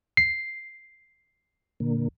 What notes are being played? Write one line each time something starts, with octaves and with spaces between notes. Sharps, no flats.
C7
A#2 D3 A#3